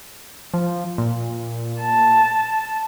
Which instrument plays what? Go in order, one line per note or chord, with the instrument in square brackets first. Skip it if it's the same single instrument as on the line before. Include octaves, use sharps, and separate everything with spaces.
[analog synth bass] F3
A#2
[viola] A5